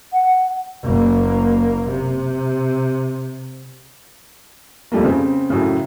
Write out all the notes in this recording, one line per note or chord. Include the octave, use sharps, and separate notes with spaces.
F#5
F#1 A#3
C3
F2 G3 A3 A#3
C#3 C4
F#2 A2 C#3